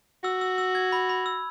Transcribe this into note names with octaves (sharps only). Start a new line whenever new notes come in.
F#4 E6
E6
E6
G#6
B5
B5
E6